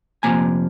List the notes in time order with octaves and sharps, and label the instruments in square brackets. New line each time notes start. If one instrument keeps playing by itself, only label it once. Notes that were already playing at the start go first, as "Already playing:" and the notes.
[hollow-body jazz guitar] F2 C3 F3 A#3 G#5 A#5